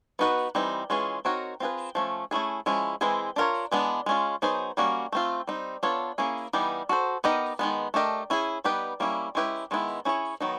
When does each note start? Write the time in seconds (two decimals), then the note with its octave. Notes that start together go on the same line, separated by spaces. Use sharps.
0.19 B3 D#4 F#4 B4
0.55 E3 G3 C4 D#4
0.90 E3 G#3 C#4 F4 G#4
1.25 C4 D#4 F#4 A#4 C#5
1.60 C4 F4 G#4 B4
1.95 F3 A3 C#4
2.31 A3 C#4 E4 G#4
2.66 F3 G#3 C#4 E4
3.01 E3 G#3 C4 E4 G#4
3.36 D4 F4 A#4 C#5
3.71 E3 G#3 B3 D4
4.06 G#3 C#4 F4
4.42 F#3 B3 D#4 G#4 C5
4.77 G3 A#3 C#4 F#4
5.12 A3 C4 F4
5.47 G3 C4 D#4
5.83 B3 D4 F4 A4 C#5
6.18 A#3 C#4 E4 G#4
6.53 E3 G3 B3 D#4 G4
6.89 D4 F#4 A4 C5
7.24 B3 D#4 G4 A#4 D#5
7.59 D#3 G#3 B3
7.94 A3 D4 G4 A#4 D#5
8.30 C#4 E4 G#4
8.64 G3 B3 D#4 G4 B4
9.00 G3 A#3 C#4 E4
9.35 G#3 C#4 E4 G4 B4
9.71 D#3 G#3 B3 E4
10.05 C#4 E4 G#4 C#5
10.40 D#3 F#3 B3 D#4